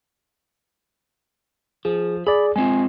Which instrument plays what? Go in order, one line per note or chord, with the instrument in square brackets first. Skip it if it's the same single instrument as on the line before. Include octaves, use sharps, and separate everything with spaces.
[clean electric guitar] F3 [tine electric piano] G#4
[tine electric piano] G#4 D5 [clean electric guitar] B5
[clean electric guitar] G#3 C4 F4 [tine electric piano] G#5